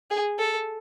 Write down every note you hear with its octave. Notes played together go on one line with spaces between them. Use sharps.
G#4
A4